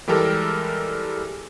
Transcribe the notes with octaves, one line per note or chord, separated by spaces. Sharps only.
E3 G3 G#3 G4 A4 A#4